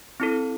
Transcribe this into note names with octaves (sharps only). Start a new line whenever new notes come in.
C4 E4 A4